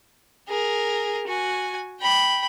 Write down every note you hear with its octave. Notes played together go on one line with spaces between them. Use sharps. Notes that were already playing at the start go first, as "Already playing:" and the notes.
G#4 A#4
F#4 G#5
G5 B5